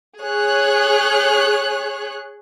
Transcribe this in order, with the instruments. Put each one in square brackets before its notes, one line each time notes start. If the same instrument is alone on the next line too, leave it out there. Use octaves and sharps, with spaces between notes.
[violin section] G#4 C#5 F#6